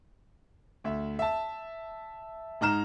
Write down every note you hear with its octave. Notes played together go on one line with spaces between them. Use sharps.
D2 E5
E5 A5
G#2 D#4 A#5 F6 E7